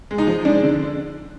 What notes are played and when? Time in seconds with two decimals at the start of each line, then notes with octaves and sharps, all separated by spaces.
0.11 G#3
0.18 D#4
0.27 F3
0.45 G#3 D4
0.63 D3